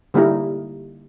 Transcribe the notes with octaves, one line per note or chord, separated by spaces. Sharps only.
D3 G3 A#3 D#4 E4